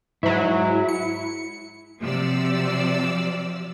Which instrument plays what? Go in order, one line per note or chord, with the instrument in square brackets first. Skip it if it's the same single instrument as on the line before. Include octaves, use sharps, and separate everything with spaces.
[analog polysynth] G#2 F#3 [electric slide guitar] E4
[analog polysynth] C#7
[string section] C3 F3 F#3 D5 E6